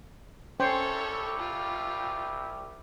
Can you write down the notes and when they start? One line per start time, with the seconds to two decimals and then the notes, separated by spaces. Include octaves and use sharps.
0.60 C2 C#4 E4 G4 A4 C5 C#5 G5
1.39 F4 G5